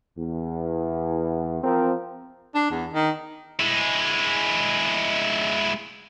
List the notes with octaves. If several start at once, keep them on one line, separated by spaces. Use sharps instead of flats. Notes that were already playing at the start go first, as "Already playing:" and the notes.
E2
F3 C4 A#4
D4
E2
D#3
G#3 E4